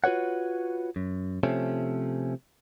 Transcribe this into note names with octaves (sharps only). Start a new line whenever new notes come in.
F4 F#4 B4 C#5 F#5
F#2
C3 F3 A3 C#4